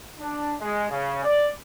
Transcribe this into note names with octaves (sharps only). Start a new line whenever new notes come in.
D4
G#3
C#3
D5